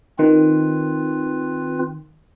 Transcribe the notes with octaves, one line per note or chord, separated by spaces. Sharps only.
D#3 C4 F4 B4